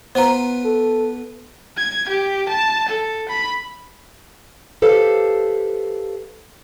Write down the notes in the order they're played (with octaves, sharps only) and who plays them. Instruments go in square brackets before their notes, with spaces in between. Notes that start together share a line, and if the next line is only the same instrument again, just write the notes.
[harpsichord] B3 F4 B4 [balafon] C5 A#5
[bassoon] A4
[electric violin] G#6
G4
A5
A4
B5
[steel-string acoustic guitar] G4 A4 B4 C5 F5